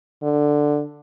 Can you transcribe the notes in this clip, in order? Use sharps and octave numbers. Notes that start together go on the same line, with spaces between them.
D3